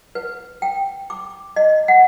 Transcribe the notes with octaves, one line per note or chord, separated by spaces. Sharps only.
B4
G5
D6
D#5
F#5